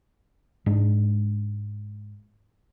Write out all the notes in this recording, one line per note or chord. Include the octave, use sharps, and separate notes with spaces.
G#2 G#3 D4